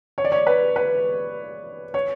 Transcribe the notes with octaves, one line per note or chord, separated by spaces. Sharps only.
C#5
D5
C#5
B4
B4
C#5